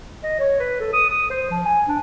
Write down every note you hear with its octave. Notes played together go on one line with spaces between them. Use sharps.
D#5
C#5
B4
A4
D#6
D#6
C5
F3
G#5
D4